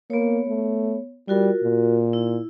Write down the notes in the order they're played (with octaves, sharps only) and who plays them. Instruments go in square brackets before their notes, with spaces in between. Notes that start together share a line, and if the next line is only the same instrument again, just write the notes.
[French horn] A#3 [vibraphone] B3 C#5
[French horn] A3
[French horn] G3 [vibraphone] F4 F#4 A#4
[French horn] A#2
[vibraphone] E4